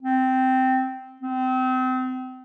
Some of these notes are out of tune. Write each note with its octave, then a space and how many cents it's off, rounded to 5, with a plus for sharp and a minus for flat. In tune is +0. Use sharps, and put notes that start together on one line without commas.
C4 -10
C4 -30